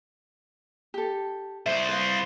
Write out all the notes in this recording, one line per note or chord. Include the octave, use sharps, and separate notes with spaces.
G4 A4
C2 C5 E5
B4 F5